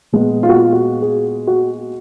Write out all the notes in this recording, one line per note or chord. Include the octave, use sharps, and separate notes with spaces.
A#2 G#3 B3
F4
F#4
F4
F#4
G#4
F#4